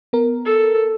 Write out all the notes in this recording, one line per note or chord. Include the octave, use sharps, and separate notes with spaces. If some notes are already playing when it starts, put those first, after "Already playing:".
B3 A#4
A4